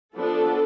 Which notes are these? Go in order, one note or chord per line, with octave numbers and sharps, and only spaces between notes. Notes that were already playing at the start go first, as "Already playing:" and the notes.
F3 B3 D4 A4